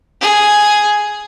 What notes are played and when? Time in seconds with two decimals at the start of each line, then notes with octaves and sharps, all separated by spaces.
0.21 G#4